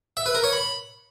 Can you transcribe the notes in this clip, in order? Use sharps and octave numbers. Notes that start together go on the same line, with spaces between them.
E5
B4
A#4
C#5
B5